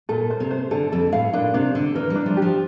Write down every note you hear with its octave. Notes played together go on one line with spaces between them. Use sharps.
A#2 A4
C5
C3
C5
D3 A4
F2 A4
A2 F5
A#2 D4
C3 D4
D3 D4
E3 A#4
G3
D4
F3
G4
F3